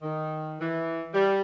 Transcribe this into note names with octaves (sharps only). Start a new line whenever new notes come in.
D#3
E3
G3